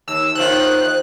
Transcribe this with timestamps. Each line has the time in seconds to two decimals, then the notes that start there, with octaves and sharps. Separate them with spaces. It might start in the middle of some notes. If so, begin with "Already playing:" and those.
0.08 D#2 E6
0.35 D#2 D#3 F4 C5 F#6